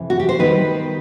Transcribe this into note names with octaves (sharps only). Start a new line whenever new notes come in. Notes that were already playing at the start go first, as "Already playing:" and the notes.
Already playing: F2 C3 E3
F#4
G4
C5
D#3 G3 B3 D#4 B4